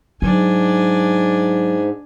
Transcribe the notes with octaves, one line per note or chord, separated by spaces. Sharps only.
G#2 F#3 D4 G#5